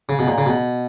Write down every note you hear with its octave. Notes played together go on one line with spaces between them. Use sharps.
C#3
B2
A#2
C#3
B2